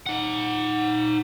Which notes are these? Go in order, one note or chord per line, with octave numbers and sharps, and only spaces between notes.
D#4 F#5